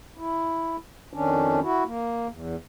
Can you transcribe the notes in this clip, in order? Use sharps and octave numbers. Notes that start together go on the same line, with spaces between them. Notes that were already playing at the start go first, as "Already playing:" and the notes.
E4
F2 D#3 C#4 D4
E4 F#4
A#3
E2